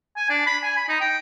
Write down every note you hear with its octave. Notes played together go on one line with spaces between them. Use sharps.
G#5
D4
B5
G#5
B5
D#4
G5